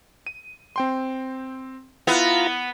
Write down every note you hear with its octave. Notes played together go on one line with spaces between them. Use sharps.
D#7
C4 G5 C6
B3 E4 F4 A#5 F#6